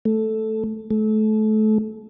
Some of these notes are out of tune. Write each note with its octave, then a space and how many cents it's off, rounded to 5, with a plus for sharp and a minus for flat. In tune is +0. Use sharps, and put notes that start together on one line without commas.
A3 -5
A3 -30